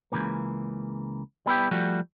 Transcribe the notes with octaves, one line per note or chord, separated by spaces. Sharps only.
C#2 G#2 C#3 E3 A#3
G3 B3 E4 G4
F3 G3 A3 F#4